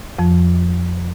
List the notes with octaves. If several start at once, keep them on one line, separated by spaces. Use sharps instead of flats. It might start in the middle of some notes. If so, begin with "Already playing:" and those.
F2 F3